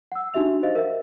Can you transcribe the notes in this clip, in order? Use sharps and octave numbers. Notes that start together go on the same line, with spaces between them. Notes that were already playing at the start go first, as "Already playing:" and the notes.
F#5 E6
D4 D#4 F#4 G4 E5 F7
G4 C5 D#5 F5
A#4 E5 F#5